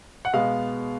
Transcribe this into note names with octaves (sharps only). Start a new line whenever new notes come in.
F#5
B2 G#3 B3 F5